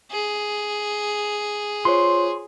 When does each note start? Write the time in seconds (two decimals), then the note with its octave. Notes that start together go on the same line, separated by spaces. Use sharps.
0.11 G#4
1.85 F4 C5 C#5 C6